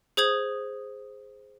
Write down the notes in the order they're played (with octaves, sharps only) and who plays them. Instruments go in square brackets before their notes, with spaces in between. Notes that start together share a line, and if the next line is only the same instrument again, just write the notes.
[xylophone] G#4 C5 D#6 G#6 F#7